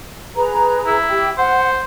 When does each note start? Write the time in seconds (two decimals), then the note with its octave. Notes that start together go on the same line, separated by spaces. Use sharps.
0.35 G#4 B4 A#5
0.86 E4
1.09 G4 G5
1.38 C5 F#5